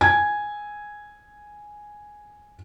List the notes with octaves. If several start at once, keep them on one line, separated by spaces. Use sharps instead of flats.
G#5 G#6